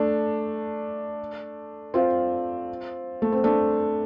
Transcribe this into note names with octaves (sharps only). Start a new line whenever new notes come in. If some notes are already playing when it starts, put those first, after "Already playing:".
Already playing: A3 D4
C4 F4
A3
C4
A3 D4